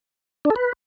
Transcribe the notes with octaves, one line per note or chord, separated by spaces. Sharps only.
D4
A4
B4